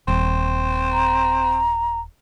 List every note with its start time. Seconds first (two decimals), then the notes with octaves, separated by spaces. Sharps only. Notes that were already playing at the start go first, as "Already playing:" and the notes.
0.08 D#1 C4
0.92 A#5